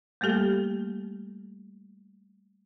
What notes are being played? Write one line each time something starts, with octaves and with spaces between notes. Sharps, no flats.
G3 A3 A#3 G4 A4